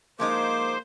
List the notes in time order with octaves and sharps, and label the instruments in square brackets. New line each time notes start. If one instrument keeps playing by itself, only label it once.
[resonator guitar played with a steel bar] F3 G#3 D#4 [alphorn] A#3 [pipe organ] C5 [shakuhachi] D6